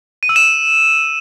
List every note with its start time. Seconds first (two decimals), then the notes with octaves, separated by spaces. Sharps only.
0.23 D#7
0.29 E6
0.36 E7